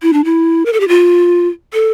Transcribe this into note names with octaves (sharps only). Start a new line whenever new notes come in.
E4
D4
E4
A#4
A4
G4
F4
A4